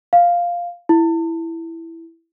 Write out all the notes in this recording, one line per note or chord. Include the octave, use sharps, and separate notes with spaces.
F5
E4